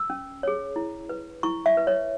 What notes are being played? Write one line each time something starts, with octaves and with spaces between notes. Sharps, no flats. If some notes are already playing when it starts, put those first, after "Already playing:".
Already playing: E6
C#4
G#4 C#5
E4
B4
E4 C#6
E5
B4
C#5